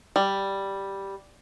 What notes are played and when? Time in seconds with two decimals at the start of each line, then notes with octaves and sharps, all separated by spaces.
0.16 G3